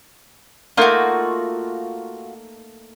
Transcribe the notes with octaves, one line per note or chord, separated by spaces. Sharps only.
A3 A#3 D#4 F4 F#4